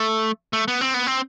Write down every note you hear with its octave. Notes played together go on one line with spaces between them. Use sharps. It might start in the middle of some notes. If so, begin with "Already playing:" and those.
Already playing: A3
A3
B3
C4
B3
C4